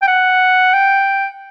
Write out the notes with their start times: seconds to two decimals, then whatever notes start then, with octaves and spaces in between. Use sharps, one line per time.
0.02 G5
0.08 F#5
0.73 G5